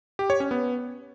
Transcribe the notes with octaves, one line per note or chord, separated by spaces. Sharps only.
G4
C#5
C#4
B3